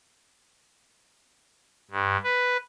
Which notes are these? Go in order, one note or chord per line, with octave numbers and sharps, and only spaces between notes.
G2
B4